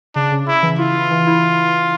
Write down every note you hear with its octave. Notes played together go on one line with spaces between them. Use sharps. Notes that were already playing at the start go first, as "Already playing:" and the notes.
C#3 D4
C#3
C#3 E4
E3
E4 F4
E4
E3
E4